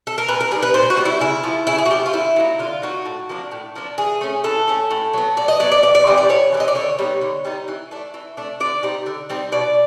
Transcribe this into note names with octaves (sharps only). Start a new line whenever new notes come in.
A4
A#4
A#2 B4
A#4
G3 B3 D#4 G#4
B4
A#2 C5
F#4
G3 B3 D#4
E4
C#3 E4
F3 A3
C#3 E4
G#4
F#4
F3 A3 G4
F4
D3 E4
F#3 A#3 D#4
D3 F4
F#3 A#3 D#4 F#4
A2
F3 A#3 D4
A2
F3 A#3 D4
E3 G#4
A3 C#4
E3 A4
A3 C#4
A2
F#3 B3
A2 D5
D#5
F#3 B3 D5
D5
A2 D5
D5
E3 G3 C4 D#5
D5
A2 C#5
E3 G3 C4 D#5
D5
D3 C#5
G3 B3 D#4
D3
G3 B3 D#4
E3
A3 D4
E3
A3 D4
D3 D5
G3 C4 D#4
D3
G3 C4 D#4
B2 D5